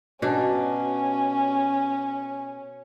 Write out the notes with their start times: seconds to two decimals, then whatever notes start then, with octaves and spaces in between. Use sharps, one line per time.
0.22 B2 C#4 D4